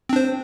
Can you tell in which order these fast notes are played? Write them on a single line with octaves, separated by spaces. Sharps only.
C4 D4 C5